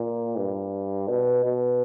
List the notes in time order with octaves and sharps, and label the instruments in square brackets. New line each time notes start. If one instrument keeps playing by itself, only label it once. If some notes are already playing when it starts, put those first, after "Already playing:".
Already playing: [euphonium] A#2
G2
B2
B2